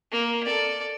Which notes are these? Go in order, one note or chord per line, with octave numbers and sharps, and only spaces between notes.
A#3
A4 D5